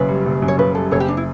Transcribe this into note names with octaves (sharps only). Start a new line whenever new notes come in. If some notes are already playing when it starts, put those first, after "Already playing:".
Already playing: F#1 F#2 C#3 B4
G3
F#1
F#2
C#5
C#3 B4
G3 A4
F#1 A4 C#5
G4
D4
E4